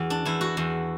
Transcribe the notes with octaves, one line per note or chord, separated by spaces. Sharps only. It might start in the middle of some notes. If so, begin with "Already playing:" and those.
Already playing: E2 F#4
D4
E2 E4
F#4
E2